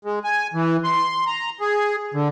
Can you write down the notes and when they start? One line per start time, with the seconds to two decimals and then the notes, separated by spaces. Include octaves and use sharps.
0.05 G#3
0.24 G#5
0.54 E3
0.84 C6
1.27 A#5
1.60 G#4
2.14 D3